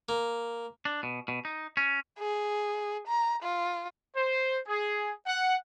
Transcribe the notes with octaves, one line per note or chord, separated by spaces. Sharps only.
A#3
D4
B2
B2
D#4
C#4
G#4
A#5
F4
C5
G#4
F#5